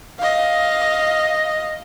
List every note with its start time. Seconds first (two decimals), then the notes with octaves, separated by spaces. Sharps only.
0.18 D#5 F5